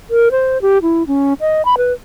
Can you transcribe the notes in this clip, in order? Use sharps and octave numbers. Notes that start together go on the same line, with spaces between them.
A#4
C5
G4
E4
C#4
D#5
B5
B4